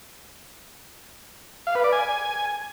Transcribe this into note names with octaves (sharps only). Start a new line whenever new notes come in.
F5
B4
D5
G#5